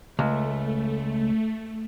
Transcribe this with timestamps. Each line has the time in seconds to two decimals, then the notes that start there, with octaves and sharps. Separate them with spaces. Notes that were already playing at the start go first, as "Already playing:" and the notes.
0.19 C#2 A3